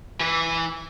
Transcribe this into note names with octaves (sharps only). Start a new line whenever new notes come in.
E3 B4